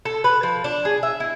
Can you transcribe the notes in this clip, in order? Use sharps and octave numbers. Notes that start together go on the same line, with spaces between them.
A4
B4
F3
D4
G#4
E5
E4